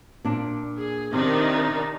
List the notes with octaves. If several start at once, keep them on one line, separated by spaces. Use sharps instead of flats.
A#2 D4
G#4
C3 D#3 D4 D#4